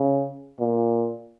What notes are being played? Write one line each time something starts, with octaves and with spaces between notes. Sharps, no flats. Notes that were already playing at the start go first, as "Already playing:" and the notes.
Already playing: C#3
A#2